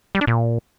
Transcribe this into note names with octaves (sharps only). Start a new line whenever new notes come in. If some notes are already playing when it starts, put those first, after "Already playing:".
G3
D4
A#2